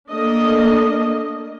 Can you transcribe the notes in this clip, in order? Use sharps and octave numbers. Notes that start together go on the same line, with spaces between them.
A3 A#3 D4 D#5